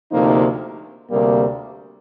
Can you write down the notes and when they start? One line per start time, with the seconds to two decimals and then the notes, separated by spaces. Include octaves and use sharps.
0.11 D2 C3 F3 A#3 D#4
1.10 D2 C3 G3 A#3